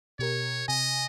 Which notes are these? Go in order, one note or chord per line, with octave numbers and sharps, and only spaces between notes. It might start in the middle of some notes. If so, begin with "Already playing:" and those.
B2 G4 A#4 C#5
C3 D#5 G#5